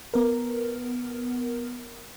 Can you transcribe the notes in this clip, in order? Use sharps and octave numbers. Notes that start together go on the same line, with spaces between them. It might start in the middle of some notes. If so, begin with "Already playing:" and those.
B3 A#4